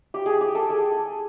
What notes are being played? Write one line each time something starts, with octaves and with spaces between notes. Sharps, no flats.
G4
G#4
G4
A4
G#4